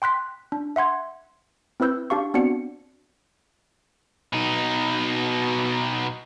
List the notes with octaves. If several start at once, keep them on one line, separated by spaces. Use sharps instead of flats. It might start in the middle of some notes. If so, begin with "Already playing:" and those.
G5 C6 F#6 B6
D4
E5 F#5 C6 G#6
C4 E4 B4 E6 G6
D4 G4 F5 C#6
B3 C4 D4 F#4 D5 C#7
B2 D#4